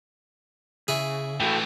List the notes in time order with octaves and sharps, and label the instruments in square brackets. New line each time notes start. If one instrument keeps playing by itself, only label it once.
[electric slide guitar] C#3 [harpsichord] E4 G#4
[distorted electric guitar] A2 E3 [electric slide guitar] F#4 A4 G5